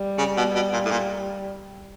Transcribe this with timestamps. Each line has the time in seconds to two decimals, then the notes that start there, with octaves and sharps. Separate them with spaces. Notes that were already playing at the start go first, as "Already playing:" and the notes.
Already playing: G3
0.18 C#3
0.37 B2
0.55 B2
0.73 A#2
0.85 A2
0.91 A#2